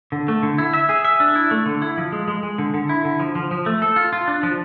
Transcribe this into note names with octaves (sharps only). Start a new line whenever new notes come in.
D3
A3
D3
E4
E5
G#4
E5
D4
E4
A3
D3
E4
F3
G#3
G#3
G#3
D3
D3
E4
D3
F3
F3
F3
A3
A4
F4
F4
D4
F3